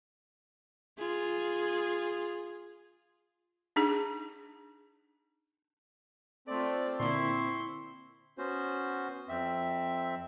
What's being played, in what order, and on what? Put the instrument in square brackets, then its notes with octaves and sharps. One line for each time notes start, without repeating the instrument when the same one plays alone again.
[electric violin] F4 G#4
[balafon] D4 D#4 G#4
[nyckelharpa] A3 F4 [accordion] C4 [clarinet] D5
[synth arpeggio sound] A#2 D3 A#3 [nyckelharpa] E4 C#6 [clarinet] C6
[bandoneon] B3 C#4 F#4 C5
F2 C4 E5